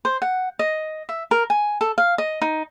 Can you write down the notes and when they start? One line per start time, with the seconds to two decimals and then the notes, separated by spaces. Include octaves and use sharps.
0.05 C5
0.22 F#5
0.59 D#5
1.09 E5
1.31 A#4
1.50 G#5
1.81 A4
1.98 F5
2.18 D#5
2.42 D#4